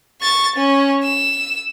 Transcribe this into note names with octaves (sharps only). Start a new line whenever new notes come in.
C#6 A6
C#4
E6